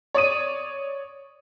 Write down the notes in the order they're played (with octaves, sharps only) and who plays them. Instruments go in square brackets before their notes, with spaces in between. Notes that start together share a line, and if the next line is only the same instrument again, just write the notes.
[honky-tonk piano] C#5 D5 D#6 D#7